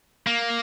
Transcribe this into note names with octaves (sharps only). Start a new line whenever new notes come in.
A#3